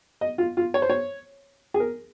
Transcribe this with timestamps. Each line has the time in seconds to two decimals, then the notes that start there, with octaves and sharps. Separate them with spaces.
0.21 D#5
0.38 F4
0.57 F4
0.74 C#5
0.82 C5
0.90 C#5
1.74 G#4
1.80 A#4